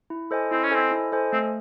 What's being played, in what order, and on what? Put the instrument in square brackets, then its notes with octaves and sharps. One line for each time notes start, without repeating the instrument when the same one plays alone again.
[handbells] E4
A4 C5 D#5 G#5
[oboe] C4 [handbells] E4
[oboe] C#4
[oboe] C4 [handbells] A4 C5 D#5 G#5
[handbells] E4
A4 C5 D#5 G#5
[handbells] A3 [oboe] C4